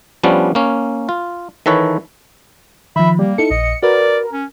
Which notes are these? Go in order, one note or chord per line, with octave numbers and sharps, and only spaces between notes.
F3 G3 B3 C#4 D4
A#3 C#4
F4
D#3 E3 A4 B4 C#5
D#3 F3 E5 B5
G3 A#3
D#4 E4 A4 C#7
A#1 D#5
F#4 A#4 B4 D5
C#4